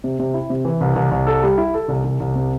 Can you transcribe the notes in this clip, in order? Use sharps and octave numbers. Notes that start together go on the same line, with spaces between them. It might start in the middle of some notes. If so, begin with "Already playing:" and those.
C3
C3
E4
C3
E3
C2
C2
C2
A4
G3
E4
A4
C2
C2
C2
C3